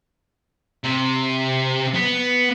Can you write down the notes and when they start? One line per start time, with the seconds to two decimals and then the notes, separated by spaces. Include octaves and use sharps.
0.84 C3
1.94 B3